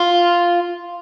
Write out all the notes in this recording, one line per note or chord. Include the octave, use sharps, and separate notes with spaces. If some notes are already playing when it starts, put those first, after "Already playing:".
Already playing: F4